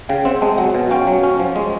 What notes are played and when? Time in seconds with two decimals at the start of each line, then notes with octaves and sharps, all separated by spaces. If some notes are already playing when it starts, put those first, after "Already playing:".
0.09 C#3 F5 G5
0.25 C4 E5 F#5
0.41 G#3 G5 A5
0.58 F#3 F#5 G#5
0.75 B2
0.90 C#4 F5 G5
1.07 F#3
1.23 C#4
1.40 F3
1.56 G#3